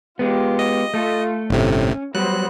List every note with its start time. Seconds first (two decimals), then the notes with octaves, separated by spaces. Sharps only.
0.19 G#3 B3 F4 G4
0.59 D#5
0.94 A3 F4 A4
1.50 G1 A2 C3 C#4
2.15 F#3 G3 B3 C5 F#6